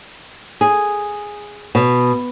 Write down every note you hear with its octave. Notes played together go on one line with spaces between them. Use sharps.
G#4
B2